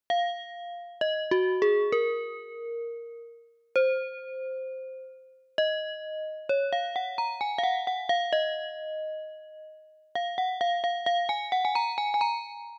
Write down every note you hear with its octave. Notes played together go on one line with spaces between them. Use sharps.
F5
D#5
F#4
G#4
A#4
C5
D#5
C#5
F5
F#5
A#5
G#5
F5
F#5
F#5
F5
D#5
F5
F#5
F5
F5
F5
G#5
F#5
G#5
A#5
G#5
G#5
A#5